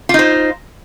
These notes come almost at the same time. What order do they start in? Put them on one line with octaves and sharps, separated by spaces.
F4 D#4 C5